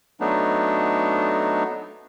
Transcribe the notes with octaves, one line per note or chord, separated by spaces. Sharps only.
F#3 A3 B3 D4 D#4